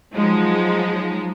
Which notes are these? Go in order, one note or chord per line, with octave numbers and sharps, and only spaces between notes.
F3 F#3 G#3 D#4